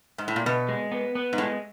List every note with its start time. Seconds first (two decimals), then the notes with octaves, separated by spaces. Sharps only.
0.18 G#2
0.28 A2
0.36 A#2
0.46 B2 B3
0.69 G#3
0.92 B3
1.15 B3
1.33 G#2
1.38 A2 G#3